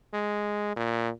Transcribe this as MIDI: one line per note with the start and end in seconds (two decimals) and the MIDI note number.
0.14 0.72 56
0.76 1.10 46